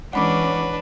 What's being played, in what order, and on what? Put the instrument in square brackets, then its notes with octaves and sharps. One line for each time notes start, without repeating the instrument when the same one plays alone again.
[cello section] E3 G#3 C#4 [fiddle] D4 B4 [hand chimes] F#5 B5 D6